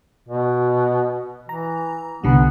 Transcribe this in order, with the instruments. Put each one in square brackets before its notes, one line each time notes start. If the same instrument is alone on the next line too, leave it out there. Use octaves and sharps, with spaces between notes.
[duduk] B2
[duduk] E3 [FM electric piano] A#5
[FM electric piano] C2 D3 G3 [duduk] B3